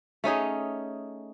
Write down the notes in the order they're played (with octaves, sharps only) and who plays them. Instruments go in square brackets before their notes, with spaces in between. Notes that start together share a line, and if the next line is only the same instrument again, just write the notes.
[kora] A3 C#4 D#4 G#4